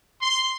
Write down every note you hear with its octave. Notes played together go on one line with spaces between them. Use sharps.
C6